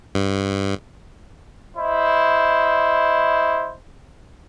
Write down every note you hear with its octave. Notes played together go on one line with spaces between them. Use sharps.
G2
E4 C5 D#5